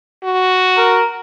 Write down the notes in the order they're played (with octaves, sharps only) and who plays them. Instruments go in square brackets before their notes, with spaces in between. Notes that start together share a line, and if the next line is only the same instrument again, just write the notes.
[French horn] F#4
[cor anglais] A#4